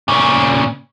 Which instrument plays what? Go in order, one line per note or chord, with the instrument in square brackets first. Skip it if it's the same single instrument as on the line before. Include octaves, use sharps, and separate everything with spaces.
[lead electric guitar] A#2 C#3